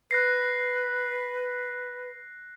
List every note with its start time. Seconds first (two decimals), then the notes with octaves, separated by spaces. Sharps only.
0.11 B4 F#6 A#6 C7